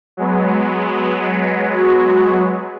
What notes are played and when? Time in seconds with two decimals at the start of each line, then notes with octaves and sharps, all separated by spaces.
0.17 F#3 G#3 B3
1.76 F#4